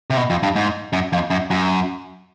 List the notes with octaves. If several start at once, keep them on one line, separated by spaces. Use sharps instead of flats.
C3
B2
F2
G2
G#2
F#2
F2
F#2
F#2